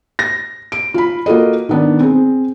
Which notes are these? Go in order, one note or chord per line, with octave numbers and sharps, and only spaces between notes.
A#6
D7
F4 B5
A#3 F4 F#4 A4 D#5
D#3 B3 D4
C4 G#4